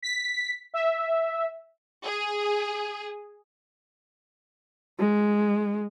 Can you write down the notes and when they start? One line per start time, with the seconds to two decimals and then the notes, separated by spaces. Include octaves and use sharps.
0.03 B6
0.74 E5
2.04 G#4
4.99 G#3